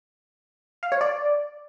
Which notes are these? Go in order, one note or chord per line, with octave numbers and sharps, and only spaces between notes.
F5
C#5
D5